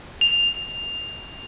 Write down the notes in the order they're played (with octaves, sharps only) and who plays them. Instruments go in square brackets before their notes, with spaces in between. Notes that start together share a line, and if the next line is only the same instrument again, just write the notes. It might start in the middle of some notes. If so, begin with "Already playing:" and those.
[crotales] F7